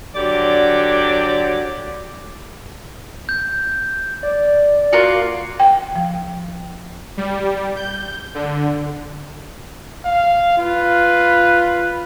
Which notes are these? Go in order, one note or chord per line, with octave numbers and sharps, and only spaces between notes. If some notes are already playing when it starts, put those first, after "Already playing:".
D3 F#3 G4 D5
G6
D5
A#3 F4 F#4
G5
F3
G3
G6
D3
F5
F4 B4